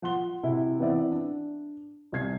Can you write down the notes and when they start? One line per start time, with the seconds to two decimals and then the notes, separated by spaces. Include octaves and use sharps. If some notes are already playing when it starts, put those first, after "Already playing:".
0.02 F3 F#5 C6 G7
0.43 C3 E4 F#4
0.79 E3 B3 C4 E4 D5 E5
1.12 D4
2.12 C2 C3 G#6 C7